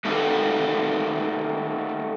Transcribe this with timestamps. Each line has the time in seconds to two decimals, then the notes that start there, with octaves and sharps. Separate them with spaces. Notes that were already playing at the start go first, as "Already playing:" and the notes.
0.05 A3 A#3 D#4 F#4 G4 A4